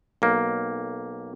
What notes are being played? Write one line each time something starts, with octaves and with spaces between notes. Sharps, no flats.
B1 A#3